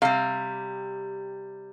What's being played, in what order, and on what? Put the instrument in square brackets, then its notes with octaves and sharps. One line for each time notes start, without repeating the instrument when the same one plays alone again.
[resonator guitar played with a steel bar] C3 G3 F5